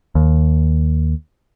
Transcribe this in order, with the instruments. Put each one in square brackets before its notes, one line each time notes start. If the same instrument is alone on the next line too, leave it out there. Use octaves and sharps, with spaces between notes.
[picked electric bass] D#2